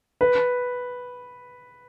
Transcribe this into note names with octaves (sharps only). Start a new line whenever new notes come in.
B4